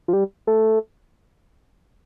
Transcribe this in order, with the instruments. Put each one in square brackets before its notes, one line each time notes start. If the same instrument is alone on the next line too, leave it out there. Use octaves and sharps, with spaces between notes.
[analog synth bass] F3
G3
A3